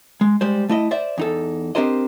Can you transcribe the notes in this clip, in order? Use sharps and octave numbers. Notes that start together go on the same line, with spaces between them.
G#3
G3 G#3 C5
A3 E4 D#5
C5 D5 E5
E2 D#4 A4
C4 D4 G4 A#4 C5 D#5